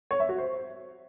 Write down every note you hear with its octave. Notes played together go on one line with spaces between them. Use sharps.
C#5
E5
F#4
C5